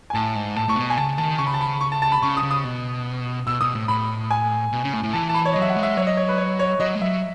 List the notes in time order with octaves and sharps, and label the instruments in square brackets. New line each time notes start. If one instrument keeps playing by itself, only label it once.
[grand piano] G#5
[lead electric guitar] A2 [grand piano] A5
[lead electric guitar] G#2
[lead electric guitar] A2 [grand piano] A5
[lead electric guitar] A2 [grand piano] C#6
[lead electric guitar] B2
[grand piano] G#5
[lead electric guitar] C#3 [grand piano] A5
[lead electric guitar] D#3 [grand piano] A5
[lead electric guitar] C#3 [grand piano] C#6
[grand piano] B5
A5
B5
C#6
A5
A5
B5
[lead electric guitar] C#3 [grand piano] C#6
[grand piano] D#6
[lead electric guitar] C#3
[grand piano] D#6
[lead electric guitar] B2
[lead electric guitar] B2 [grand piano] E6
[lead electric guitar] B2 [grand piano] D#6
[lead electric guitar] A2
[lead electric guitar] A2 [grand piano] B5
[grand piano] G#5
[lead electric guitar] B2
C#3
A2
A2
[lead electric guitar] E3 [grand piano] A5
[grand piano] A5
B5
C#5
[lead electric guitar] F#3 [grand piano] D#5
[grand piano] E5
F#5
[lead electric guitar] G#3
[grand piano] E5
[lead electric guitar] F#3 [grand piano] C#5
[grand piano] D#5
C#5
B4
C#5
C#5
[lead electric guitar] F#3 [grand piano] D#5
[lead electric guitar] G#3
[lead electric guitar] F#3 [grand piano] E5